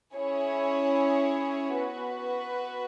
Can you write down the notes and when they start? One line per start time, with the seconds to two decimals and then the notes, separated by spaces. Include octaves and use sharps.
0.14 C#4 E4 G#4 C#5
1.75 B3 F#4 B4